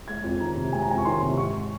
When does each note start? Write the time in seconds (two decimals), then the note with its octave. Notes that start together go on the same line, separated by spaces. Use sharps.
0.08 G#3 G#6
0.24 F2
0.40 D#3 A#5
0.56 C3
0.73 G#3 G#5
0.82 A#5
0.88 F2 G#5
0.98 C#6
1.05 D#3 C6
1.22 C3
1.38 G#2 C#6